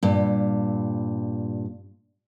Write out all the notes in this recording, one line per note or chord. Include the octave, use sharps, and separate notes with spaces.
G2 A#2